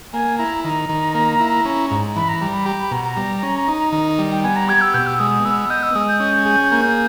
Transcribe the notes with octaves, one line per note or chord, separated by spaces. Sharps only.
A#3 G#5
E4 A#5
D#3 A#5
D#3
A#3
E4
C#4
G#2
E3 B5
A#5
G3 A#5
B5
G4 A#5
B5
B2 A#5
A#5
G3
C#4
D#4
D#3
G3
G5
B3 G#5
A#5
G4 G#6
E6
B2 G6
E6
G#3 D#6
B3 E6
D#5 G6
E6
G#3 D#6
G6
C#4
G#4
A#3